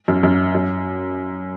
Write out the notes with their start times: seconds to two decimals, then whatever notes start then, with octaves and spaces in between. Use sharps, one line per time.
0.08 F#2
0.23 F#2
0.55 F#2